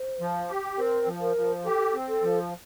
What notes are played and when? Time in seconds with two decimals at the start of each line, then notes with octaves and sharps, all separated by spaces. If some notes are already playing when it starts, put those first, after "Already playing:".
Already playing: C5
0.20 F3
0.49 G4
0.78 C4 A#4
1.07 F3
1.21 A#4
1.37 F3
1.65 G4 A4
1.94 C4
2.08 A4
2.23 F3